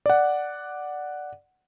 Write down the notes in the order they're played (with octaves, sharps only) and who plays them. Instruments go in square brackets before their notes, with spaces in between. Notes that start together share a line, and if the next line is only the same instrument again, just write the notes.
[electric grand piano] D5 F#5